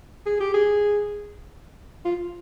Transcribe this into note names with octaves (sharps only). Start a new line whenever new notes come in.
G#4
G4
G#4
F4